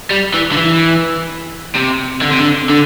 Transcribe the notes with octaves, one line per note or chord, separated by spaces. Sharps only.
G3
E3
D3
E3
C3
D3
C3
D3
D3